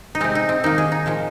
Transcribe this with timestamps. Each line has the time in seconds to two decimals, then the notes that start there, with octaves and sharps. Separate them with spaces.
0.15 D#4
0.21 C3 G#3 C4
0.35 D#4
0.49 C4
0.64 D#3 A#3 D#4
0.78 G#4
0.92 D#4
1.06 A#2 F3 G#3